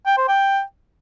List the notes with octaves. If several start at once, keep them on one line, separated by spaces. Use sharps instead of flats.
G5
C5
G5